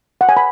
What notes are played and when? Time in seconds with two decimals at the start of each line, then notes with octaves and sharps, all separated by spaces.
0.21 F#5
0.29 G#5
0.37 B5